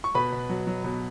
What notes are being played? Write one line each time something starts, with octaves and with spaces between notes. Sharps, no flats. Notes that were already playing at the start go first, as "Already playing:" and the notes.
C#6
B2 B4 B5
B2
F#3
F#3
B2